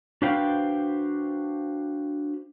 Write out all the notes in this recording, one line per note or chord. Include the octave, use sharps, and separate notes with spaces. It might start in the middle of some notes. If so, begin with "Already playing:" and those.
D4 F#4 B4 C5 F5 G5